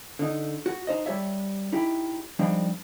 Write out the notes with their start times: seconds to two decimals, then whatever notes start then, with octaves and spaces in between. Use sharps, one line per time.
0.19 D3 D#4
0.66 F#4
0.87 D#4 C5 D#5
1.06 G3 G4 C#5 E5
1.73 D#4 E4 G4
2.39 F3 G3 G#3 C4 D4 D#4